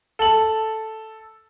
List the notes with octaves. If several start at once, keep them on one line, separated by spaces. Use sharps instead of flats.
A4 F#7